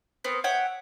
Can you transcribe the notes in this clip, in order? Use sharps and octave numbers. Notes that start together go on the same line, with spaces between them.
B3 C4 A#4
C#5 E5 F#5 G5